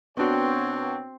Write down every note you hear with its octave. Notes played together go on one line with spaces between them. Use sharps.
B2 B3 C4 D4 F#4 C#5 G5